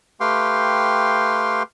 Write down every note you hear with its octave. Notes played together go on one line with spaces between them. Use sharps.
A3 G4 B4 F5 G5 C6